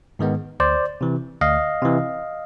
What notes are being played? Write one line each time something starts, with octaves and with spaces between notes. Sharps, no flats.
G#2 D#3 G#3 B3
D2 C5 D5
C3 E3
D2 D#5 F5
C3 E3